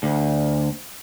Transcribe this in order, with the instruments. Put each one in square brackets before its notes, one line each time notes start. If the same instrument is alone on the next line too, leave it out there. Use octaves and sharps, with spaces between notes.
[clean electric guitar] D2